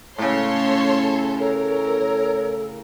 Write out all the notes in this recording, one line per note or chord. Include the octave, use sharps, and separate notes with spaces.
A2 C#3 A4 C#5 C6
A4 A#4 C#5